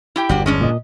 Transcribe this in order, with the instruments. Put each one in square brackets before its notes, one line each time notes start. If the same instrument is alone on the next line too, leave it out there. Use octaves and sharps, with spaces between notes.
[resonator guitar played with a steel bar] E4 G4 G5
[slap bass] G1 E2 [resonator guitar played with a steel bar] D4 F#4 G4
[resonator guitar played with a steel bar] G#3 C#4 D4
[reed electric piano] A#2 D#5